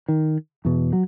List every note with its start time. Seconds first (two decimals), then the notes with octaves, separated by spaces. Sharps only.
0.08 D#3
0.65 E2 B2
0.93 F#3